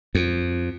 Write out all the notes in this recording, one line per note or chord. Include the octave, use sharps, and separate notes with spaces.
F2